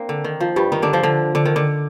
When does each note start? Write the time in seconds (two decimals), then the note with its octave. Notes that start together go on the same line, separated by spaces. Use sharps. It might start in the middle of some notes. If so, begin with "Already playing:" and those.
Already playing: A#3 C4 D4
0.09 D3
0.24 D#3
0.40 F3
0.56 G2 G3
0.72 D#3 D#4
0.82 D3 D4
0.93 F3
1.03 D3
1.35 D3
1.45 D#3
1.56 D3